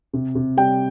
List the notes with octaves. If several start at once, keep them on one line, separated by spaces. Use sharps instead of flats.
C3
C3
G3 G5